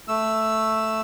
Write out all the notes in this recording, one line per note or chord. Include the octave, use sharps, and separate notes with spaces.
A3 E6